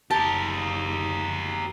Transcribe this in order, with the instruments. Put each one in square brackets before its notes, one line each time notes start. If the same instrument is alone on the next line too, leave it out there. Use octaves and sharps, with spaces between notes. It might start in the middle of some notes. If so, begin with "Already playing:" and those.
[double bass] F#1 [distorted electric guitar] G4 A#4 [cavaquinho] A5